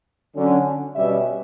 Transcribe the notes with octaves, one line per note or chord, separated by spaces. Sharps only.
D3 F#3 C#4
B2 G3 C#4 E5